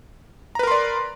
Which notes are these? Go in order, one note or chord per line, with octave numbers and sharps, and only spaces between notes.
A#4 B4 D5 A#5 C6